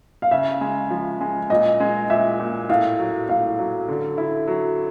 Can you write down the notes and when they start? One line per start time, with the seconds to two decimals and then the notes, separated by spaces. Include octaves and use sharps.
0.22 F5
0.31 C#3 E5
0.61 G#3
0.91 F3
1.21 G#3
1.50 A#2 D#5
1.80 G#3
2.10 A#2 E5
2.40 A#2
2.69 A2 F5
2.99 F#3
3.29 A2 F5
3.59 F#3
3.88 D3
4.18 E4
4.48 F#3